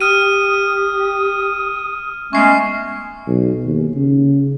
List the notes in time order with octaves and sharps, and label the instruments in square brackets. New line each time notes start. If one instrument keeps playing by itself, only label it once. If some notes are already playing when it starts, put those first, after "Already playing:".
[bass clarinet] G4 [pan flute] D#6 [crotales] F6 D#7
[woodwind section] G#3 A3 C#4 [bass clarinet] B3 [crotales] C#6 C7
[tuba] B1
D#2
C#3